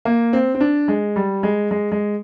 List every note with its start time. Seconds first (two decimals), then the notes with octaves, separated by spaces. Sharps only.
0.05 A#3
0.33 C4
0.55 C4
0.60 D4
0.88 G#3
1.16 G3
1.43 G#3
1.71 G#3
1.92 G#3